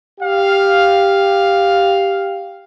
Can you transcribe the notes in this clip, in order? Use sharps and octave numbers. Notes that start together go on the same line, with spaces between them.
G4 F5